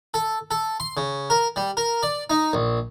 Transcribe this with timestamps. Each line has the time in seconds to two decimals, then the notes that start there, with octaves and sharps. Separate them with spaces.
0.14 A4
0.51 A4
0.80 C6
0.97 C#3
1.30 A#4
1.56 G3
1.77 A#4
2.03 D5
2.30 D#4
2.53 A#1